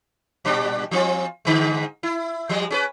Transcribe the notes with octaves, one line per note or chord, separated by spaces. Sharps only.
A#2 G3 D4
F3 C4 F4
G#2 D3 G#3
E4
F3 G3 G#3
C#4 G#4 B4